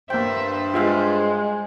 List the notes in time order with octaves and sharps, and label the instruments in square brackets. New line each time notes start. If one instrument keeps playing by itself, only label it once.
[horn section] G2 [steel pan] A#3 G5 [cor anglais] C5 [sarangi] E5
[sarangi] G#3 [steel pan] F4 E5 F5